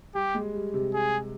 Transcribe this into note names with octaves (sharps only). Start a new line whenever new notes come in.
G3 G4
G#3
G3
C3
G#4